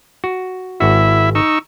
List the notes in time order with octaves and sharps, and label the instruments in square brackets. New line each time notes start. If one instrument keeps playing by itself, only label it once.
[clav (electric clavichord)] F#4
[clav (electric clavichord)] G#1 F#4 [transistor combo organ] E4 E5
[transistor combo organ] D#4 C#6 E6